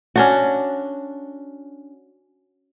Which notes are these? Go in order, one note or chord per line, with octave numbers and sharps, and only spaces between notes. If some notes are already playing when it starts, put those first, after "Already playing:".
C#4 D4 F#4